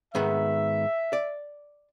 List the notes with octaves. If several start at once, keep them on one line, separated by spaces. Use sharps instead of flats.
G#2 D#3 B3 E5
D5